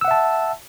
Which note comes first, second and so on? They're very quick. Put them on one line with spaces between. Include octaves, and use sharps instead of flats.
E6 F#5 E5 A5